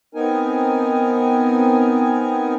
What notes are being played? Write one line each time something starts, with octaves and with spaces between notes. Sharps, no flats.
B3 C4 D#4 A#4 G#5